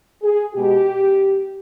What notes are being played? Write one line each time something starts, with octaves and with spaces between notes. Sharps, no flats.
G#4
B2 G#3 G4